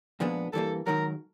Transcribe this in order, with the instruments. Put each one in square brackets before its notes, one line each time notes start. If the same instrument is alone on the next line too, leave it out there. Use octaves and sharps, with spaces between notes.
[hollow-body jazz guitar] A#2 F3 G#3 B3 D4
[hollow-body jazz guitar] G2 E3 G3 A#3 [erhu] A4
[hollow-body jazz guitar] G#2 D#3 F#3 [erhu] A#4